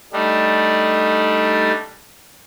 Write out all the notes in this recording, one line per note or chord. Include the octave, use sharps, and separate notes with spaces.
G3 A3 D4 D#4